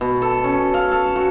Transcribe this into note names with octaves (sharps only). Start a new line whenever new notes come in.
B2
A4
C#4
F5
A4
F#4